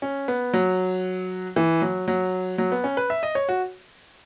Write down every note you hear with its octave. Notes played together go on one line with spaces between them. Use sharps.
C#4
B3
F#3
E3
F#3
F#3
F#3
B3
C#4
B4
E5
D#5
C#5
F#4